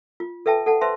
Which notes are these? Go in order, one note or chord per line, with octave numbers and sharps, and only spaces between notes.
F4
A4 B4 E5 G5 A5
A4 F#5 A5
B4 C5 E5 A5 C6